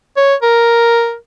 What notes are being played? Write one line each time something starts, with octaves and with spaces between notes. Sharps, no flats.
C#5
A#4